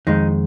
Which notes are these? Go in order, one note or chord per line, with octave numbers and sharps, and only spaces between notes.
F2 D#3 G#3 D#4